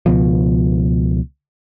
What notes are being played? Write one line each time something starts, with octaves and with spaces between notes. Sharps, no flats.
C#2 B2 F3